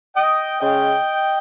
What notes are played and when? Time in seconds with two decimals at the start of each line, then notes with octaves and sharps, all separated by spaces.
0.16 D#5 G5
0.61 C#3 G#3 C#4 D#5 G5